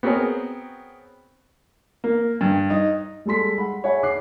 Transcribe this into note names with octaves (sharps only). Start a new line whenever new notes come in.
B3 C4 F#4 G#4 A#4 C#5
A#3
G2
D#4
G3 G#3 A4 C6 B6
F#5 B5
G#4 C#5 E5 F#5 G#5 B5
D6 F#6 C7